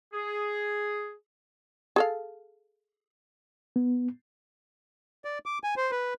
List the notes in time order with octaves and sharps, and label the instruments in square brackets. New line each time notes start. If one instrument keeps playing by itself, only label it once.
[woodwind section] G#4
[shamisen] G#4 A4 F5
[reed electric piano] B3
[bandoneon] D5
D6
G#5
C5
B4